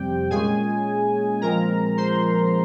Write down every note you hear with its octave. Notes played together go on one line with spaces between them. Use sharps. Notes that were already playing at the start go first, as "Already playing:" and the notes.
Already playing: F2 C3 G3 C4 G4 G5
A#2 G#3 C#4 G#4 G#5
A#2 F3 G#3 C4 A#4 A#5
C5 C6